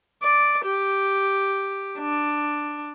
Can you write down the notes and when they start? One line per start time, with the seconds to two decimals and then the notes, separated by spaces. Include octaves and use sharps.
0.23 D5
0.65 G4
1.99 D4